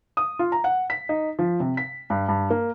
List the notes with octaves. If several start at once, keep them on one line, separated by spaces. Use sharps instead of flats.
D#6
F4
A#5
F#5
B6
D#4
F3
C3
B6
G2
G2
A#3